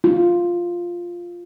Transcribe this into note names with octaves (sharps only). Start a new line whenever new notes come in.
F4